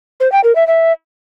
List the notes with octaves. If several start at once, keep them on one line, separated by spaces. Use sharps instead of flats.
C5
G5
A#4
E5
E5